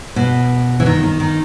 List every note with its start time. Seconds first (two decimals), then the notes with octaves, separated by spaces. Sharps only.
0.16 B2
0.80 E3
0.86 D#3
1.03 D#3
1.20 D#3